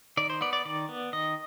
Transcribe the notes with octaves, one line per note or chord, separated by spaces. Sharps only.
D#3 D5
C5
B3 D5
D5
D#3 D5
B3
D#3 D#5